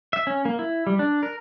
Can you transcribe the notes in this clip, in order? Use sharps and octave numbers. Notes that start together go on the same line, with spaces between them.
E5
C#4
A#3
E4
G3
D4
A#4